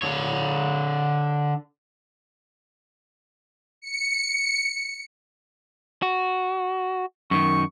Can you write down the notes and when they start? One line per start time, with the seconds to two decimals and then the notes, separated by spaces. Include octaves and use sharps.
0.02 D3 C#5
3.81 C#7
6.02 F#4
7.31 F#2 D#3 C#6